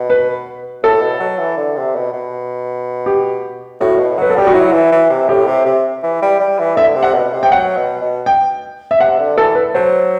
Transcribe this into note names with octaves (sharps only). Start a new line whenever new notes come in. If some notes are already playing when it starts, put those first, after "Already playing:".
Already playing: B2
B4
A2 A4
B2
F#3
E3
D3
C3
B2
B2
G4
A2 F#4
B2
F#3 B4
A4
G3 G4
F#4
F#3 E4
E3
E3
C3
A2 G4
C3
C3
E3
G3
G3
E3
D3 E5
C3
F#5
B2
C3
G5
F#3 F#5
B2
B2
G5
E5
C3 F#5
D3
E3 A4
B4
F#3 C5